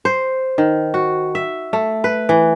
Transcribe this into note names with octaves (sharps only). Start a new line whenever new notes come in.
C5
D#3
F#4
E5
A3
B4
E3